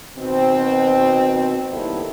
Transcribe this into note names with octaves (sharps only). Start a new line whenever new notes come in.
B2 D#3 C4
D#3 G3 A#3 B3 E4 A4